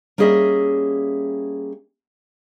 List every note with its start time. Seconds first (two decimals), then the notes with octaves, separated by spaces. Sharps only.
0.18 G3 A#3 C#4 G#4 D#5 E5